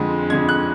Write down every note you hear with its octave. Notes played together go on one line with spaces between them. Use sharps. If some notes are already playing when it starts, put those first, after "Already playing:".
Already playing: F2 D3 G#3
F2 D3 G#3 G#6
F#6